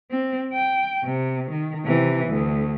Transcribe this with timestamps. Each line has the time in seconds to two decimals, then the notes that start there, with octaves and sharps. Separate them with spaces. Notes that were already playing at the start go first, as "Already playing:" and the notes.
0.11 C4
0.53 G5
1.04 C3
1.51 D#3
1.85 C3 E3
2.28 D2